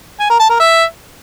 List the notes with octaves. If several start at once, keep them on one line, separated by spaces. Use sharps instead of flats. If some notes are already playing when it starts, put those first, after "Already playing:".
G#5
A#4
A5
A#4
E5